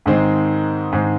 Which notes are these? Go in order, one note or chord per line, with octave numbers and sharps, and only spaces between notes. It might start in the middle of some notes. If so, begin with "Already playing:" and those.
G#2 D#3 G#3 C4
G#2 D#3 G#3 C4